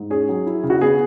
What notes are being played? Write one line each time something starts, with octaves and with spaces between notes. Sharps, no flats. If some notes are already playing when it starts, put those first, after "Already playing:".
Already playing: G#2
C#4 G#4
F#3
E4
C#3
F#4
B3 G#4